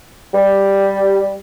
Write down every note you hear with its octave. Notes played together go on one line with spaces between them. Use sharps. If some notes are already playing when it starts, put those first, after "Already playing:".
G3